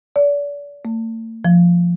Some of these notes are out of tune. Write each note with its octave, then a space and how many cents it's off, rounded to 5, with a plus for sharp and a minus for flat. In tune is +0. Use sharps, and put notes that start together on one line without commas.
D5 -35
A3 +45
F3 -5